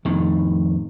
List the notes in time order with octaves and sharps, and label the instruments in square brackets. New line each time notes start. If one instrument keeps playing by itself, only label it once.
[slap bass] F2 A2 D#3